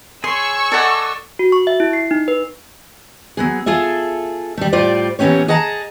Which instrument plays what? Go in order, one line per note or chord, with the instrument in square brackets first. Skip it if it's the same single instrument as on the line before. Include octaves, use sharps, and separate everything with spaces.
[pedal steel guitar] G#4 C#5 [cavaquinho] C6 [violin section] C#6 E6
[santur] A4 F#5 G#5 [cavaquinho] D5 D#5
[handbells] F#4
C#6
E5
E4
C7
D#4
B4
[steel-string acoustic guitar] F#3 B3 G#4
F4 G#4 A4 E5
G3 A3
A2 G3 F4 C5 D5
A#2 E3 B3 C#4 G4 C#5
G#4 D#5 F#5 A5 A#5